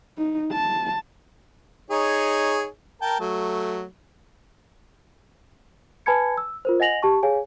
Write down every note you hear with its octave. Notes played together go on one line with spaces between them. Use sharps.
D#4
A5
D#4 G#4 C#5
A#4 G5 A5
F#3 A3
B4 G#5 A5 B5 G#6 C#7
E6
F4 A#4 C5
D#5 F#5 G#5 A#6 F7 F#7
G4 A5 C#6
G#4 C#5 F5 G#5